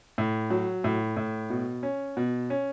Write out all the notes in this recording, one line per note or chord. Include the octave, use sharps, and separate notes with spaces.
A2
F#3
A2
A2
B2
C#4
B2
C#4